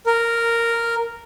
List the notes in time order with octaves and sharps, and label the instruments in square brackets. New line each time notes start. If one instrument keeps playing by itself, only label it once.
[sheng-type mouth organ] A#4